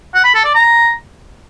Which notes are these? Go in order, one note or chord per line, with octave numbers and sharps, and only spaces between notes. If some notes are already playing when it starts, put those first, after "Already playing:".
F#5
B5
A4
D5
A#5